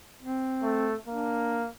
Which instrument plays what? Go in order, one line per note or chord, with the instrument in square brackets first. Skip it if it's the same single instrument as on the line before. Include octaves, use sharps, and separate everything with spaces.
[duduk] C4
[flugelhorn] A3
[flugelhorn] A#3 [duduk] D4